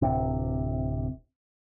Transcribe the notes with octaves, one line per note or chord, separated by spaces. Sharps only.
D1 C3